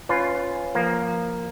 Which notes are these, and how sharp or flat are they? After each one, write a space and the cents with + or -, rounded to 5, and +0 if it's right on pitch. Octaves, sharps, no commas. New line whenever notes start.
C#4 +0 F4 +0 B4 +20
F3 +0 A#3 +0